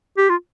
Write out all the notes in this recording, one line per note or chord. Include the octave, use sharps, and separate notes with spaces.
G4
F4